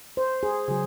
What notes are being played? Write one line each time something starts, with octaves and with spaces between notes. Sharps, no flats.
C5
G#4
C#3 F#3 G#4